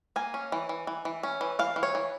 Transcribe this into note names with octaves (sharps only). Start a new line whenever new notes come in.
A#3 G#5
C#4
E3
E3
E3
E3
C#4
E3
E3 F5
E3
C#5
E3